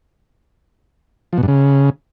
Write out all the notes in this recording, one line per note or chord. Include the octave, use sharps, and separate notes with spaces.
F3
B2
G2
C#3